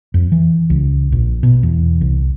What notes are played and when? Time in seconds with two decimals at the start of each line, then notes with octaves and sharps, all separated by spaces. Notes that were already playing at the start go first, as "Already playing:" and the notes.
0.14 F2
0.32 E3
0.70 C#2
1.12 A#1
1.43 B2
1.63 E2
2.01 C2